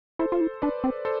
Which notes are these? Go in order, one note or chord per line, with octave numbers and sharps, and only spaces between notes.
E4 A4 C5
F4
E4
D4 B4 D5
C4
A4 C5